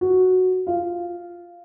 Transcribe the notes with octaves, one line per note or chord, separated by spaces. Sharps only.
F#4
F4